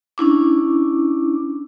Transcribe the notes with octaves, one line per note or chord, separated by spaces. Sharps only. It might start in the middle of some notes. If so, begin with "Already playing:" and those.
C#4 D4 E4 D6